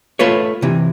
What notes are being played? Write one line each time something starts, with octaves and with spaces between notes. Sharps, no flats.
A3 F4 B4 C#5
C3 E3